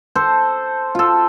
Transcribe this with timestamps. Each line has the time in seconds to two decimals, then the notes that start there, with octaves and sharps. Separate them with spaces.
0.15 A4 C5
0.95 F4 A4